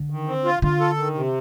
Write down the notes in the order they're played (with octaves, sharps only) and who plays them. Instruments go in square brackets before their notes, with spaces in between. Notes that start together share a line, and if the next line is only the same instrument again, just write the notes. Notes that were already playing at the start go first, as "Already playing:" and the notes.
Already playing: [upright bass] D3
[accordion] D#3
C4
F4
[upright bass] D3 [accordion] F4
[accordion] A4
D#3
C3